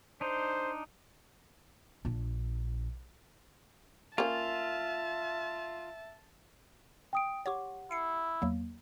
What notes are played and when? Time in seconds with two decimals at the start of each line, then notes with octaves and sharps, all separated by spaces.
0.21 D4 D#4 C5
2.05 A#1 D4
4.18 A#3 C#4 F4 E5 A5
7.13 G5 D#6 D7
7.46 G4 C#5 F#5 C#6 D6
7.91 E4 C7 C#7
8.42 E2 F#3 A#3